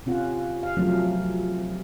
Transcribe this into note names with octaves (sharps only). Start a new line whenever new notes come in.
C3 C#4 F4 F#5
F5
C3 F3 F#3 A3 C#4